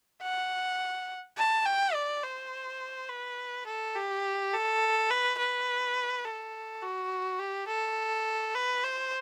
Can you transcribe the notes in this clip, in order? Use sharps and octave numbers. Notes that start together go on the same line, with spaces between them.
F#5
A5
G5
D5
C5
B4
A4
G4
A4
B4
B4
A4
F#4
G4
A4
B4
C5